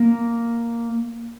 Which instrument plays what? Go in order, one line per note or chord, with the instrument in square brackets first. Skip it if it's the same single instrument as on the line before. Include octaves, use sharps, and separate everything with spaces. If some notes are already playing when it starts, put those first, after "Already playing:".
Already playing: [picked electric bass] A#3